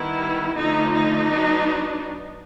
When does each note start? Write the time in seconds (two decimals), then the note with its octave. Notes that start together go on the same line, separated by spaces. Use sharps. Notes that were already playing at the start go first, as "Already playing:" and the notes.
Already playing: D#3 G3 B3 E4
0.56 D3 F3 A3 D#4
0.93 D#4
1.29 F#3 B3 D4